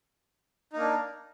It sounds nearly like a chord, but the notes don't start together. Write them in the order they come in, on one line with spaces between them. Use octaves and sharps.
D#4 A#3 D4